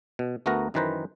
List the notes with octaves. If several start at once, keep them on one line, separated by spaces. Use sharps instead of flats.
B2
D2 A3 B3 F#4 A#4 A#5
F#2 D#3 E3 B4 C5 A#5